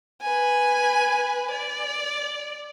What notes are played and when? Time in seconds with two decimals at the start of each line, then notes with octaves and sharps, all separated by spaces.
0.22 B4 G#5
1.51 D5